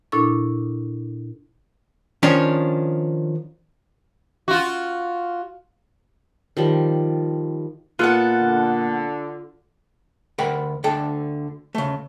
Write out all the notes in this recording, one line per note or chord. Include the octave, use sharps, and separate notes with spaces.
A#2 D4 E4 A4 C#6
D#3 F3 C#4 D4
F4 F#4
D#3 F3 G3
A#2 B3 F4 A4 F#5
D3
D2 A#4 F#5 G5 B5
D2 D3 D4 A4 G5
C#3 A3